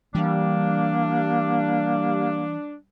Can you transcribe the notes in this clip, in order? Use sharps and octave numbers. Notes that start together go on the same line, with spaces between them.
E3 G3 A#3 D4